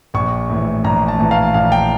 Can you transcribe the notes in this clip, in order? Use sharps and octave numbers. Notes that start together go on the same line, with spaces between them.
A#1 C#6
A2 E3
A#1 A#5
A5
A2 E3
F5
A#1 F5
G5